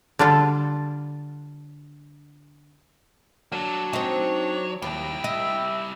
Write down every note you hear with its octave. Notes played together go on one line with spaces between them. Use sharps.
D3 G3 D4 F4 A4
F#3 A#3 D4 A4
C4 D#4 C#5
D#2 G3 E4 G5
D#5 E5